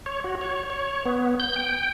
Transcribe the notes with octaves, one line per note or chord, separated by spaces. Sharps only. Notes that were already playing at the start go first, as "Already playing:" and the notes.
C#5
F#4
C#5
C#5
B3
G6
G5